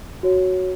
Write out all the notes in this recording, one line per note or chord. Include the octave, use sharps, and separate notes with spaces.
F#4 C#5